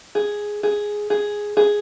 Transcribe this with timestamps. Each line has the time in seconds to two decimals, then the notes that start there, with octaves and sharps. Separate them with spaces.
0.15 G#4
0.63 G#4
1.10 G#4
1.57 G#4